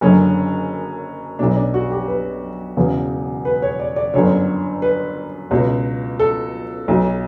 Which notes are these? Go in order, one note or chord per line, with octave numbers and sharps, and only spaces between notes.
F#1 F#2 D3 C#4
B1 B2 D4
D4
F#4
G4
B4
E1 E2 C#3 E3
B4
C#5
D5
D5
G1 F#2 D3 C#5
B4
C#2 B2
A4
B1 B2